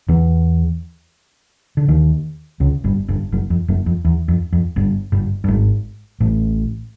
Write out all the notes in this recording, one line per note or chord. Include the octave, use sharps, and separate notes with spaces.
E2 E3
D3
D#2 D#3
C#2 C#3
G1 G2
G1 G2
F#1 F#2
F2
F#1 F#2
F2
E2
F2
F2
G1 G2
G1 G2
G2
G#1 G#2
A1 A2